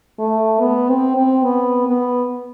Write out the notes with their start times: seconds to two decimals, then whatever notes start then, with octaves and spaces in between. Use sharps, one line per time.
0.19 A3
0.61 B3
0.89 C4
1.17 C4
1.44 B3
1.87 B3